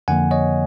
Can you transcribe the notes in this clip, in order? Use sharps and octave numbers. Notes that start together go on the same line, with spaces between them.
F2 D3 F3 A#3 F#5 G#5
C#5 D#5